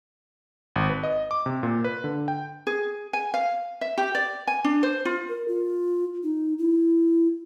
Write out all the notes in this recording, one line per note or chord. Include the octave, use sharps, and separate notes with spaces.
G#1
B4
D#5
D6
C3
A#2
B4
D3
G5
G#4
G#5
F5
E5
G4
D5
G#5
D4
C5
F4
A#4
F4
D#4
E4